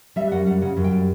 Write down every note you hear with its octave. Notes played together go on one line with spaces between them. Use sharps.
G3 E5
F#2 F#5
G3 F#5
C#3 F#5
F#2
G5
G3